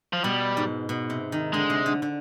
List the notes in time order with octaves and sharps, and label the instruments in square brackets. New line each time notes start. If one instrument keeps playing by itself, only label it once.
[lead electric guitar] F3
[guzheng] B2 [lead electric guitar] G3
[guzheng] G#2
B2
C3
D#3
[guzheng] D3 [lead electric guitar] G#3
[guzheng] C3
D3
D3